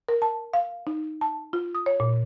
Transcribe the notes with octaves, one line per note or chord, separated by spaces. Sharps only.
A#4
A5
F5
D#4
A5
F4
D#6
C#5
A#2